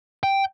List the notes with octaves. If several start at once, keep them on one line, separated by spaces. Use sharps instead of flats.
G5